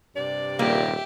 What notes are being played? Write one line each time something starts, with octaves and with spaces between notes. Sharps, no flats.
G2 C3 D5
D#1 A#3 G4 E5